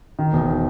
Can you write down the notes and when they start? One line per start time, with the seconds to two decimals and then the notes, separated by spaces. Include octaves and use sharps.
0.19 D#3
0.33 E1